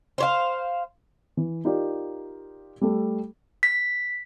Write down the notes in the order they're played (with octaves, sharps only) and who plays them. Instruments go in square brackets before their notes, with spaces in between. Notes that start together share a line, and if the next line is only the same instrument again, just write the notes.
[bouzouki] C5 C#5 F5
[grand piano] E3
D#4 F4 G4 A#4 D5
G3 A3 A4
[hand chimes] B6